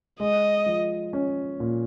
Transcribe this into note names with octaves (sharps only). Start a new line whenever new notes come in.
G#3 D#5
F3
C#4
A#2